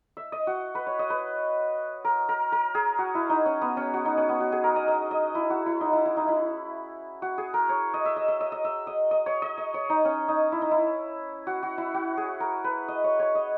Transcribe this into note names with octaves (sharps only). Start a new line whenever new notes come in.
E5
D#5
F#4
B4
C#5
D#5
B4
A#4
A#4
A#4
G#4
F#4
E4
D#4
C#4
B3
C#4
F#4
D#4
C#4
B3
F#4
G#4
A#4
D#5
D#5
D#5
E4
F#4
E4
D#4
E4
E4
D#4
E4
F#4
G#4
A#4
C#5
D#5
E5
D#5
E5
D#5
D#5
E5
D#5
D#5
C#5
D#5
D#5
C#5
D#4
C#4
D#4
E4
D#4
E4
F#4
F#4
E4
F#4
G#4
A#4
B4
D#5
C#5
C#5
D#5